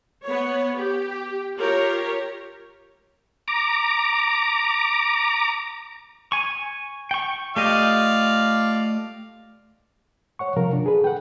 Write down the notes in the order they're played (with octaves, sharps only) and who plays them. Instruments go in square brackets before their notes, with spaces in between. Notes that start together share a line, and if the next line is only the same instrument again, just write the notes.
[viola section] B3 C#5
G4
F4 G4 A#4 C#5
[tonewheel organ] A#5 D6
[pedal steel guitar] G#5 C#6
G5 C#6
[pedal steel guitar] A3 G4 D#5 [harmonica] F4 D5 F5
[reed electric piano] C#5 F#5 C#6
C3 F3 A#4 F5
D4
G#4 A4 B4
F#5 G5